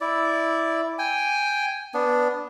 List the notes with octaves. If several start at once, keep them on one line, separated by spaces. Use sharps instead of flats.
E4 D5
G5 G#5
B3 D4